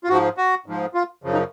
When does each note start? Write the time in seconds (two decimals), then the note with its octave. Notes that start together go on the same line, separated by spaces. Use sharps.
0.04 F4
0.09 G#2 F3 F#4
0.37 F#4
0.66 G#2 F3
0.94 F4
1.24 F#2 C#3 F3
1.33 D#4